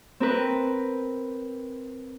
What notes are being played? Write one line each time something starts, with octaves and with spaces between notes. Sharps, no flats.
C4 A#4 B4